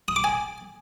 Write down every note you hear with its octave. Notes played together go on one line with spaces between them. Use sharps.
D#6
D6
G#5